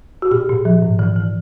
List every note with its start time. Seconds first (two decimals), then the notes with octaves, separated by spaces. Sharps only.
0.22 F#4
0.31 A#2 G4
0.49 A#2
0.65 F3
0.82 G#2
0.99 E3
1.16 E3